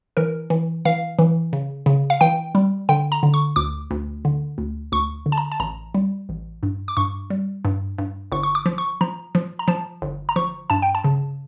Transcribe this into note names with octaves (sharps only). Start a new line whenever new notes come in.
E3 A#4
E3
E3 F5
E3
C#3
C#3
F5
E3 G5
G3
D3 G5
A#5
D3
C#6
D2 D6
D2
D3
D2
D2 C#6
D3
A5
A#5
A5
A1 A#5
G3
A1
G2
D6
G2 C#6
G3
G2
G2
G1 C#6
C#6
D6
F3
C#6
F3 A#5
F3
A#5
F3 A5
G1
A#5
F3 C#6
G2 A5
G5
A5
C#3